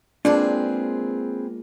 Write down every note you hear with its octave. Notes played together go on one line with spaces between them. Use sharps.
G#3 A#3 C4 D4 F4 G#4 B4